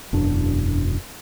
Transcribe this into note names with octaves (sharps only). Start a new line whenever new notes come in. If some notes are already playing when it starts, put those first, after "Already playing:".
E1 F#2 D4